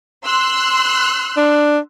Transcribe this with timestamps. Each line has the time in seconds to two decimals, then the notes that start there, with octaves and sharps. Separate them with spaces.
0.25 C6 E6 F#6
1.37 D4